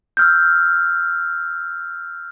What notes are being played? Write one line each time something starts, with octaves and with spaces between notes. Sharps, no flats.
E6 F6 G6